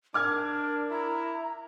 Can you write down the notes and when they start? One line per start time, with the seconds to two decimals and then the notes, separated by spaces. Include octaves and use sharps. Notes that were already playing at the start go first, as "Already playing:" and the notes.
0.14 D4 A#4 D6 F6 G#6
0.90 E4 A#5